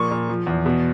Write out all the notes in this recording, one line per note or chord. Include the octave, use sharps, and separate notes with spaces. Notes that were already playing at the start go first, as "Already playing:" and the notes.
Already playing: A#2 F3 C#6
A#2
F3
E2
B2